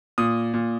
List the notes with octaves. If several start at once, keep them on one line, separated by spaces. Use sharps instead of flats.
A#2 D#6
A#2